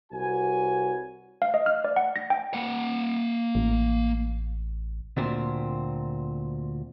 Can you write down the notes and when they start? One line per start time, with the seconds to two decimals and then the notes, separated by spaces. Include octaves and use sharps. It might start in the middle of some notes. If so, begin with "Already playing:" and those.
0.12 C2 F#4 B4 C#5 G#5
1.42 F5
1.54 D#5
1.66 F6
1.84 D5
1.96 F#5
2.16 A#6
2.30 G5
2.54 A#3 F#5
3.55 A1
5.17 D2 A#2 C4